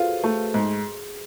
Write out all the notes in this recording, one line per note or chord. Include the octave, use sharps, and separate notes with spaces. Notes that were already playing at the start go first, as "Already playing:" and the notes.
Already playing: F4 F#4 G#4 A4 B4 C5
A3 F#4
G#2 G#4